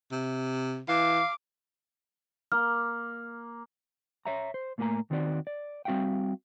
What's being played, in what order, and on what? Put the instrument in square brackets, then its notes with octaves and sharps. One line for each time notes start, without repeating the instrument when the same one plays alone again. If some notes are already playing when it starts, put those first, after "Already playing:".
[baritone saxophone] C3
[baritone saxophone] E3 [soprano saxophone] F5 [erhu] D6
[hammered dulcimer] A#3 [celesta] F6
[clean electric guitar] C#5 E5 A#5
C5
A2 A3 A#3 G4 G#5 A#5
D#2 D#3 C4 F#4 A4 D5
D5
G3 C4 F#4 E5 F5 G5